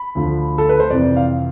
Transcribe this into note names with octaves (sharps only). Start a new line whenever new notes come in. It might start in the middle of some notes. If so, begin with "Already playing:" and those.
Already playing: B5
D2 D3 F3
A4
B4
C5
F2 C3 E3 D5
F5